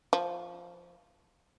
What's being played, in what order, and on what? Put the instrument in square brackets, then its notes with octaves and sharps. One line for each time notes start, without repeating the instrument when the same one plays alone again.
[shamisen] F3